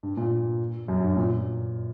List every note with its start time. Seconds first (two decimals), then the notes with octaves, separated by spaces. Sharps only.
0.03 G2
0.17 A#2
0.88 F#2
1.03 G2
1.17 A#2